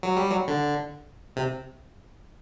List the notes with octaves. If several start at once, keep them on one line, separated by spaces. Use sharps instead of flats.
F#3
G3
F#3
D3
C3